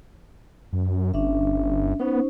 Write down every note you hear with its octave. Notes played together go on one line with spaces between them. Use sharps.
F#2
G1 C#4 D4 E5
B3 C#4 D#4 C5